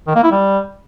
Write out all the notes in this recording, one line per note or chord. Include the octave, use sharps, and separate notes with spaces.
D#3
A#3
E4
G3